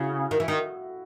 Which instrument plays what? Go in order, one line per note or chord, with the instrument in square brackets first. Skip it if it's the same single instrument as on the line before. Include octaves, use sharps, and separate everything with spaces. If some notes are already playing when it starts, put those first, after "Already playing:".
Already playing: [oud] C#3 [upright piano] E4 F#4
[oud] D#3
E3
D#3